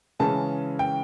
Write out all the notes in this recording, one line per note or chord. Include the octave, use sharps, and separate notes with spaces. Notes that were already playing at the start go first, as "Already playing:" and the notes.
C#3 E3 G#3 C#4 A5
G5